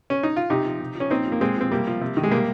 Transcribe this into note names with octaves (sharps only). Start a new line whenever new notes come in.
C#4
D#4
F4
C3 D#4 G4
F3
C3
F3
C#4
A#2 C4 D#4
F3
A#3
A#2 G#3 C4
F3 C4
C3 G3 A#3
F3
C3
D#3
G#3
C3 G3 A#3